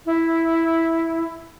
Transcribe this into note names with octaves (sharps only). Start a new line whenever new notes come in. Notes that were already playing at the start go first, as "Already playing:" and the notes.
E4